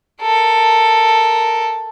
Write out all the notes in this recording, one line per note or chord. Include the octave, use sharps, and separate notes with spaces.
A4 A#4